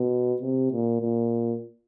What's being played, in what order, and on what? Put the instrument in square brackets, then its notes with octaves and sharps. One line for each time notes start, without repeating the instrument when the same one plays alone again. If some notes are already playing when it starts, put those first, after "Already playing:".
Already playing: [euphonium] B2
C3
A#2
A#2